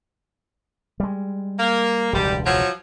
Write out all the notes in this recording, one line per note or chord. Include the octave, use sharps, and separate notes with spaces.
G3 G#3
A#3
E1 C#2 D3 G3
F3 F#3